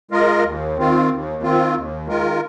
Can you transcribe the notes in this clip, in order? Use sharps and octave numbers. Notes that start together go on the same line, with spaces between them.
G#3 F4 A#4 D#5
D#2
D#3 C4 F4
D#2
D#3 C4 F4
D#2
D#3 G#3 F4 A#4